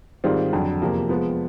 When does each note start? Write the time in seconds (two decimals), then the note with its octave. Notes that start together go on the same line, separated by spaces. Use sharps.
0.24 G#2 D#3 G3 C4 F4
0.53 F2 D3 F#3
0.82 E2 C3 F3 A#3
1.09 F3 G#3 B3